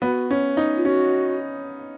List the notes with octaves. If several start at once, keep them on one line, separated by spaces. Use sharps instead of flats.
B3 F#4
C#4
D#4
F4
C#4 F#4